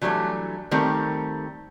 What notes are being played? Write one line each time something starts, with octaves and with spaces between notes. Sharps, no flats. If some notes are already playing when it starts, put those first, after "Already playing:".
E3 F#3 G3 A3 D4
D#3 G3 A3 C4 G4 A#4